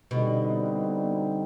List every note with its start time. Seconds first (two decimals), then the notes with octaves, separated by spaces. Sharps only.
0.11 B2 D3 G3 C4 D#4